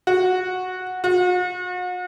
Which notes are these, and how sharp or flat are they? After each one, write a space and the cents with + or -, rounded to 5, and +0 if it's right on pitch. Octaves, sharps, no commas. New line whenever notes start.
F#4 -10
F#4 -40